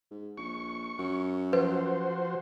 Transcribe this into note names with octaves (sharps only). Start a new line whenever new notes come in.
G#2
A#1 C#6
F#2
F3 F#4 B4 C5